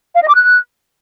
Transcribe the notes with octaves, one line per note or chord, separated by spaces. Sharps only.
F5
D#5
D6
F#6